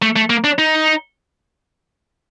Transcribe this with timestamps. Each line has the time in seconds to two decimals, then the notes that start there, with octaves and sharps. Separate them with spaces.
0.02 A3
0.16 A3
0.30 A#3
0.44 D4
0.59 D#4